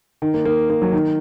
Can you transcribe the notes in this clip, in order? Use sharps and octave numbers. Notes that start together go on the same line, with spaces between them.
D#3
A#3
A#3
A#3
F#3
D#3